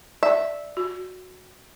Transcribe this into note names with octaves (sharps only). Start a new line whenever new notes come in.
D5 E5
F#4